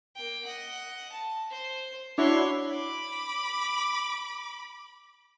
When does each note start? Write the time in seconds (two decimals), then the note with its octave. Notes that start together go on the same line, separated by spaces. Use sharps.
0.16 A#3 G5
0.45 D#5 F#5
1.12 A5
1.51 C5
2.18 D4 E4 F#4 C#5 C6
2.71 B5 D6